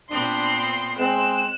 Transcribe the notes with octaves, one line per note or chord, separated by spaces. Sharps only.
A#2 B3 C4 D4 C6
G#3 C4 F#6 E7